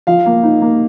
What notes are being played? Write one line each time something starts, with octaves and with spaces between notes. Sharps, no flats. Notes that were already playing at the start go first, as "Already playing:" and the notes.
F3 F5
A#3
D#4
A#3